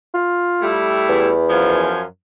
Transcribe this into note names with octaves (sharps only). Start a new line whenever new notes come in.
F4
G3 A3 E4
E2
F#2 F3 G#5